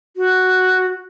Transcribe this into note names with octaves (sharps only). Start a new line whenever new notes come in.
F#4